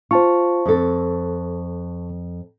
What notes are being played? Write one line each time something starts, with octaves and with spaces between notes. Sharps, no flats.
F4 C5 A5 C#6
F2 A4